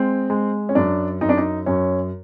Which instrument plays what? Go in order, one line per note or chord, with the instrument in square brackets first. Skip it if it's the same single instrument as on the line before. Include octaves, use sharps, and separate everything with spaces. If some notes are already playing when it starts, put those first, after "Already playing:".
Already playing: [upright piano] G#3 C4
G#3
C#4
F#2 D4
F#2 D#4
D4
D#4
F#2 C#4